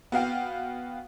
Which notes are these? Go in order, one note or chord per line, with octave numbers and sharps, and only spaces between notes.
B3 F#4 F5 G5